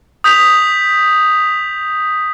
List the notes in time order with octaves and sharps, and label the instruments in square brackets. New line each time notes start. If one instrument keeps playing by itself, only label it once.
[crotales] D#6 G6 B6 F7